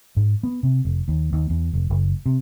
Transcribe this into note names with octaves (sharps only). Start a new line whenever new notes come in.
G#2
B3
C3
F1
D#2
D#2
E2
F1
F#1
C3